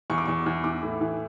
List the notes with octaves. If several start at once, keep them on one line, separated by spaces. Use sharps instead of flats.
E2 C#6
D6
E2 C#6
E2
E3 D6
A2
E3